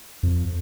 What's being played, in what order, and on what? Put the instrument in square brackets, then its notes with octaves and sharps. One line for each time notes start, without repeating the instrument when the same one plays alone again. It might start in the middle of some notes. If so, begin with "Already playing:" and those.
[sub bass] F2